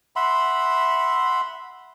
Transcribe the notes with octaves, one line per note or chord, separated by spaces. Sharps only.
E5 F#5 B5 C6